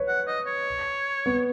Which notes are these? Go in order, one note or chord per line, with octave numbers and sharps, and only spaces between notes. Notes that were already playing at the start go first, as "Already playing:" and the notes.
Already playing: B4 C#5
F#5
D#5
C#5
B3